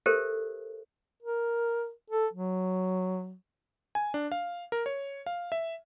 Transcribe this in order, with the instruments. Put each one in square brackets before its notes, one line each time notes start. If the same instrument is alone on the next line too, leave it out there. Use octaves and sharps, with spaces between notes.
[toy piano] G4 A4 A#4 C5 E5
[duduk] A#4
A4
F#3
[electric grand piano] G#5
D4
F5
A#4
C#5
F5
E5